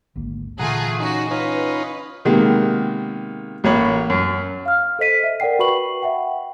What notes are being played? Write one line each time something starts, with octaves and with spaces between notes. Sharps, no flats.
G#1 D2 A#3
A#2 D3 E3 A3 F4 G#4 F#5 A#5
C#4 D#4 F#4
C#4 D#4 F4 B4
C3 D#3 G#3 A#3 B3
A1 A#3 C#5 B5
F#2
F5 F6
A4 C5 D#5 B6 D#7
E5
A#4 D5 F#5 G5 C7
F#4 B4 B5 C#6 F#7
E5 F#5 G5